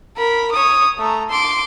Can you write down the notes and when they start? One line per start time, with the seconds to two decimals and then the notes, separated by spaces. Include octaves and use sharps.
0.17 A#4 B5
0.52 C#5 D#6
0.98 A3 A#5
1.30 C6 D6